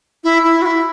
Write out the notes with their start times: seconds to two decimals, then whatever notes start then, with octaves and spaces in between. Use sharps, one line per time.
0.24 E4
0.44 E4
0.62 F#4
0.66 E4